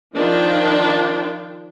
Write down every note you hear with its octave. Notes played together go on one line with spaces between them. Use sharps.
D#3 F3 D4 F4 G5